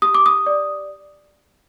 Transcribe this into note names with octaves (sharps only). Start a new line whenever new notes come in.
G4 D#6
D6
D#6
D5